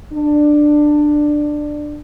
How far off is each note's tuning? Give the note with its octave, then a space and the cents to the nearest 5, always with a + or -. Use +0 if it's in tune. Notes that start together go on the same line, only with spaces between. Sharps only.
D4 +15